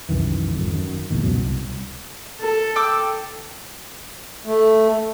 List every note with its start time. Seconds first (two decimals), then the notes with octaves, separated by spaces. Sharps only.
0.09 C2 F#2 D#3 E3
0.55 G#1 F2
0.74 F#2 D#3
1.10 B1 E2 A#2 D#3
1.23 C#2 F#2 B2 F#3
1.38 C2
2.40 A4
2.76 G5 D6 E6
4.46 A3